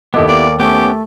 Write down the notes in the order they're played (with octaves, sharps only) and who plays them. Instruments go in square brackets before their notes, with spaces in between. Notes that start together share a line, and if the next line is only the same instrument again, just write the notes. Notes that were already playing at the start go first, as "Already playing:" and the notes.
[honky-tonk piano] D#2 A4 D6 [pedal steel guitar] B3 E4 G4 [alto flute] D#5
[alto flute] A#3 [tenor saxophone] D5
[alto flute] A3 [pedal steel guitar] B3 C#4 [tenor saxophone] G4